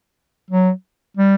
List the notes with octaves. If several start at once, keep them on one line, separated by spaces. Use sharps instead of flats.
F#3
G3